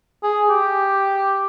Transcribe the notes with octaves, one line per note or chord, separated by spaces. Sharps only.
G#4
G4